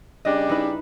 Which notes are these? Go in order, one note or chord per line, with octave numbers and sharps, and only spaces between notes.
C#3 G3 D4 D#5
D#4 E4 B4